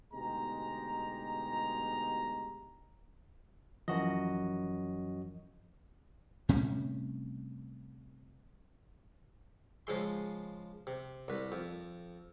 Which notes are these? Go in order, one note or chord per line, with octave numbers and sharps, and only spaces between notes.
D2 B2 G#3 D#4 G4 A#5
F#2 E3 F3 F#4 D#5
A2 C3 G3 C#4
C#3 F3 G#3 C6
C3
C2 B4
F2